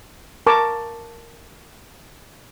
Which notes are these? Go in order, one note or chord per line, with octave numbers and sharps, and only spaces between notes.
A#4 A5 C#6 D6